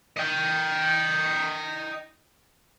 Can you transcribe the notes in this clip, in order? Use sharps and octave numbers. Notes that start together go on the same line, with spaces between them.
D#5 G5